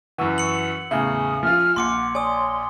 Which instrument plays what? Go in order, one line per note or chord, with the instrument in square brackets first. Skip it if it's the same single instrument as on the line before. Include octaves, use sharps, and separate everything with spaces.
[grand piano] F#2 E3 [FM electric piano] F#5 C#6 E6
[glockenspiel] C#7 F#7
[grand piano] E2 A2 C#3 [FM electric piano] E5 F5 G#5 [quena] D#6
[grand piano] F3 F4 [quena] F6
[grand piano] A#1 [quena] F#5 [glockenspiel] C6 D6 C#7
[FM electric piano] C#5 D5 [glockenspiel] G#5 D#6 [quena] C6